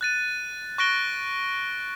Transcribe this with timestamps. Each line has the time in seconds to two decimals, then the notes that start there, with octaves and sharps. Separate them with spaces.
0.01 F#6 A6 D#7
0.78 C#6 F#6 A#6 D7 G7